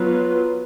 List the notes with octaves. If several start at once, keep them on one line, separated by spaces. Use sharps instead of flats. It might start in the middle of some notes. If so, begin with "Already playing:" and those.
Already playing: F#3 B3 F4 B4